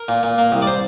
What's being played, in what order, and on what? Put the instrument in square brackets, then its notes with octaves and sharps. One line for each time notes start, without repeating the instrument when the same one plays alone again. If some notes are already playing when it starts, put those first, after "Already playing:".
Already playing: [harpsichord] A#4
A#2
A#2
A#3
C2
D5
C5